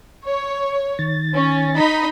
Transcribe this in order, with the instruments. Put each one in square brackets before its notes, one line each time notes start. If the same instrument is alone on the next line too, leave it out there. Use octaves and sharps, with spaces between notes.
[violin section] C#5
[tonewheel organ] D#3 A6
[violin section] C#4
D#4 D#5 B5